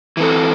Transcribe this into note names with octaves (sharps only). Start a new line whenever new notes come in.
E3 C4 A4